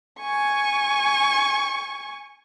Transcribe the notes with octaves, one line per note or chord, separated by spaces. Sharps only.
G#5 C#6